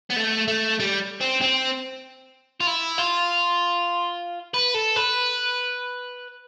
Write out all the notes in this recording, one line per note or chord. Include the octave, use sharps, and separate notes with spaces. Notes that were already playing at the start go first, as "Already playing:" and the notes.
B3
A3
A3
G3
C4
C4
F4
E4
F4
B4
A4
B4